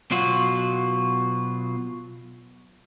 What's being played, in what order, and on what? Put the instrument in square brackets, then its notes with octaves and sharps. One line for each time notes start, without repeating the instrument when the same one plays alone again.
[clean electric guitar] B2 F#3 F4 F#4